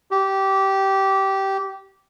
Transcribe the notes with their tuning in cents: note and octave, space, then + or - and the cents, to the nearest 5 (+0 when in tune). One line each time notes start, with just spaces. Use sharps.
G4 -15